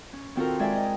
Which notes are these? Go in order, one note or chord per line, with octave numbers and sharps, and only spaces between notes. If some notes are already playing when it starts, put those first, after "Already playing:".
C#4
D#3 C4 F4 F#4 A4 A#4
G#3 D5 E5 G5 G#5
D#5